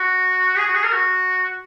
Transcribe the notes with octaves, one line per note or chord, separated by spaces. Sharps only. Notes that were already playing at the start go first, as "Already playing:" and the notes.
Already playing: F#4
G#4
F#4
G#4
A#4
F#4